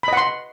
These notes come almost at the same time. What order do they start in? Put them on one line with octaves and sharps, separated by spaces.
B5 D#5 F#5 C6